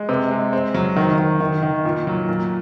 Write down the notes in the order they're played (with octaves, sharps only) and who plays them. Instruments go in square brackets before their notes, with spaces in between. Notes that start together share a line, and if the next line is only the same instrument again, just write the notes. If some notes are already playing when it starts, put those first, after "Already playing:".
Already playing: [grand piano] G#3
C3
G#3
C4
F#3
D#3
D#3
D#3
D#3
A#2
F#3
A#2